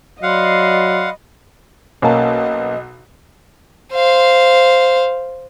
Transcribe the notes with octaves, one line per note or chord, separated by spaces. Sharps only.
F#3 D5 D#5 F5 F#5 B5 C6
B1 A#3 C#4 D#5 A5
C5 F5